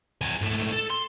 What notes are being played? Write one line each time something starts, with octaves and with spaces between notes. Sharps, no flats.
G#4 B4
G#2 A3
A4
C6